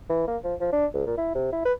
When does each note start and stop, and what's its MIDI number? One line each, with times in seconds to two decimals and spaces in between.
0.09 0.26 52
0.28 0.37 58
0.44 0.54 53
0.60 0.68 53
0.72 0.86 62
0.94 1.06 37
1.06 1.17 46
1.17 1.34 64
1.35 1.52 48
1.52 1.60 64
1.65 1.73 71